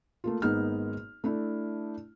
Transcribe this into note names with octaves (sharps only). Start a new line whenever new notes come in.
A3 A#3 F4
G#1 A#3 B3 D#4 G#4 F6
A3 D4 E4